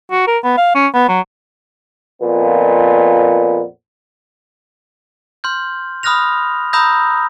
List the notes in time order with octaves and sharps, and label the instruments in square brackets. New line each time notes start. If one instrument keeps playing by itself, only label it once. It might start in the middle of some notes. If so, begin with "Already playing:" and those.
[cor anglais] F#4
A#4
B3
F5
C#4
B3
F#3
[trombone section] F2 A#2 B3
[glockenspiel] C6 F6 G6
B5 D#6 F6 F#6 A#6 F7
A#5 B5 D#6 E6 G6 A#6